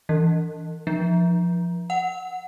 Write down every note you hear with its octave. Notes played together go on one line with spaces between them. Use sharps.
E3
F3
F#5